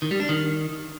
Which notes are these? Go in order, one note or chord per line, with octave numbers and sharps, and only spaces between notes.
D#3
G3
D4
D#3